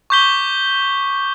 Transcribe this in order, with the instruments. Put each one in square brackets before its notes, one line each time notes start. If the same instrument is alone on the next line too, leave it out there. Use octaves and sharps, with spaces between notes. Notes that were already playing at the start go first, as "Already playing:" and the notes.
[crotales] C#6 D6 G6 B6 G7